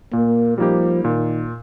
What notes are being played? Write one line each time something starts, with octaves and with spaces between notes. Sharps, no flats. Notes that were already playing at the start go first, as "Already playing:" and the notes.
A#2 A#3
F3 G3 A#3 D#4 G4
A#2 D#3